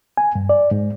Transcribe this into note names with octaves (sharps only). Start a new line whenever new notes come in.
G#5
G2
D5
G#2